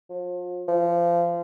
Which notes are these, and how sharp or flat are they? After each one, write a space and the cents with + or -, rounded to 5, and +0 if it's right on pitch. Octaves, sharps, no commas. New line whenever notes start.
F3 +35
F3 -25